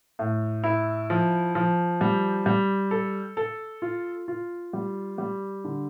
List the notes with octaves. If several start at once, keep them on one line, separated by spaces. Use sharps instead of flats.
A2
E4
F3
F3
G3
G3
A4
A4
F4
F4
G3
G3
D3